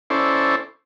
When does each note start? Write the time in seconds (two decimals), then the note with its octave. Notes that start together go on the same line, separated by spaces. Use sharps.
0.10 C#4 E4 A4 C5 D5